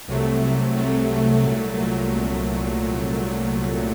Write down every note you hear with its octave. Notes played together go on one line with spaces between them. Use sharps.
C2 C3 F#3 A3
C2 C3 F#3 A3
C2 C3 F#3 A3
C2 C3 F#3 A3
C2 A#2 F#3 A3
A#2 F#3 A3